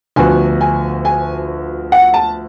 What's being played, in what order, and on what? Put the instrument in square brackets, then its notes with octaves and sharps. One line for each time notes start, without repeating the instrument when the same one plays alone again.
[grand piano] D2 D3 F3 B3 F#4 [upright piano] G#5
[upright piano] G#5
G#5
F#5
A5